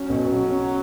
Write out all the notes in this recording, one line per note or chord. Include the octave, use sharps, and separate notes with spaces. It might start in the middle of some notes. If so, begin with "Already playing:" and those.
Already playing: F#3 C#4
B1
B1
C#4